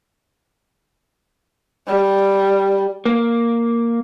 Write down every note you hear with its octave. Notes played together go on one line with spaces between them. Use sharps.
G3
A#3